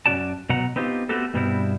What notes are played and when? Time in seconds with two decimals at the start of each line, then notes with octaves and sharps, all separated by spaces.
0.06 F#2 F3 C#4 F#4 D5 A5
0.49 B2 F#3 F#5 A#5
0.76 B3 C4 D#4 F4 G4
1.09 A3 B3 C4 F#4 G4 A4
1.34 G2 B2 G3 B3 C4 E4